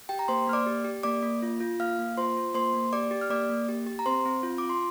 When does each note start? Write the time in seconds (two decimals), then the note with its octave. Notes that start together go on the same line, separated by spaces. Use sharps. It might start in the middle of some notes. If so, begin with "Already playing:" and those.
0.09 G4 G5
0.19 A#5
0.28 A#3 C5 C6
0.47 A#3 F6
0.53 D5 D6
0.67 G4
0.85 G4
1.03 A#3 D5 D6
1.23 A#3
1.42 F4
1.60 F4
1.80 A#3 F5 F6
1.99 A#3
2.17 F4 C5 C6
2.37 F4
2.55 A#3 C5 C6
2.74 A#3
2.93 G4 D5 D6
3.11 G4
3.21 F6
3.30 A#3 D5 D6
3.49 A#3
3.69 G4
3.87 G4
3.99 A#5
4.06 C4 C5 C6
4.25 C4
4.43 F4
4.58 F4 D6
4.69 C6